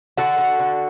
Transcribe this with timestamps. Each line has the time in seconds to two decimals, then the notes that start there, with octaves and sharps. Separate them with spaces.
0.17 D3 F#4 A4
0.38 D3
0.59 D3